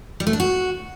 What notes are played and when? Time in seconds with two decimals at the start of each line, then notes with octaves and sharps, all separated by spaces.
0.20 G3
0.27 A3
0.33 D4
0.40 F#4